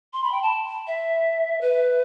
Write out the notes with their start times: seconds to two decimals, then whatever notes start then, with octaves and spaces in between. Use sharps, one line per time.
0.13 C6
0.24 B5
0.32 G5
0.42 A5
0.87 E5
1.61 B4